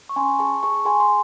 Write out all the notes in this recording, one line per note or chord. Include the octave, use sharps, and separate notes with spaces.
C#6
C#4 G#5 C6
G#4 A5 C#6
G#4 A5 C#6
G#4 G#5 C6
C6